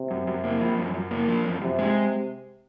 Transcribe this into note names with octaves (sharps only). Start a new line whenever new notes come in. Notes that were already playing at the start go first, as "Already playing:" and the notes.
Already playing: C3
F#2
F#2
A#3
F3
F#2
F#2
A#3
F3
F#2
F#2 C3
G#3